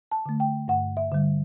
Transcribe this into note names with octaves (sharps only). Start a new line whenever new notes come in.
A5
D3 A3
G5
G2 F#5
E5
D3 G3